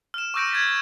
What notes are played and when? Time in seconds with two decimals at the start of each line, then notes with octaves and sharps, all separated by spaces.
0.14 F6 E7
0.34 C#6 D6 E6 G6 A#6 D7
0.51 G#6 A6 B6